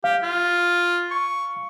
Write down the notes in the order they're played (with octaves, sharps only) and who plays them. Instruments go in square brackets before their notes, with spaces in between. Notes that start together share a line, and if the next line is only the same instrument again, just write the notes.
[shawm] G4 [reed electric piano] F5
[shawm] F4
C#6